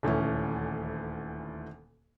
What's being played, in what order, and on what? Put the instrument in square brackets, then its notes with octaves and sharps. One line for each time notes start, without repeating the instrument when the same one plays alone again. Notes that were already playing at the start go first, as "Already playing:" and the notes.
[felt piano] D#1 D2 E3 C#4